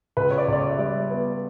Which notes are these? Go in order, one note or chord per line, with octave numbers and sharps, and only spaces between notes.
C#2 B4
C#5
D5
C#2 D5
C#5
E5
G3 D5
B3